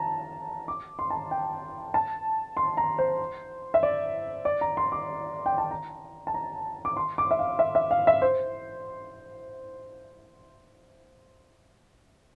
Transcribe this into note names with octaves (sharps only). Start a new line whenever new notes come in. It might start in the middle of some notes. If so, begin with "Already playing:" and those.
Already playing: A5 A#5
D6
C6
A5
A#5
G5
A5
C6
A#5
C5
E5
D5
D5
A#5
C6
D6
G5
A5
A#5
A5
A#5
D6
C6
D6
E5
F5
E5
E5
F5
E5
C5